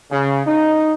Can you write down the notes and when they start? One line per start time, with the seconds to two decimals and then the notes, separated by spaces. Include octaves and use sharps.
0.11 C#3
0.46 D#4